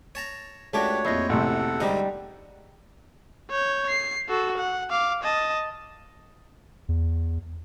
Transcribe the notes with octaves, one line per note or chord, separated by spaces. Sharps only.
C#5 A5 A#5
C#2 A3 D4 F#4 G4 C#5 G5
A#1 F2 E4 C5 D#5
A1 C3 A4 F#5
G#2 D3 G3 D#4 C5
C#5 G6
C7
F#4 A4
F#5
F5 D6
D#5 A5
E2